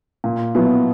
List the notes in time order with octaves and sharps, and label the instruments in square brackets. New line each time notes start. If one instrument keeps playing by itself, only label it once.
[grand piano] A#2
[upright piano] B2 [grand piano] F#3 B3 E4